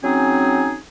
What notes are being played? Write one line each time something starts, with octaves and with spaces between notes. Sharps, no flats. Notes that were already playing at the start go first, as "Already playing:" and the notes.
F#3 C4 C#4 D#4 G#4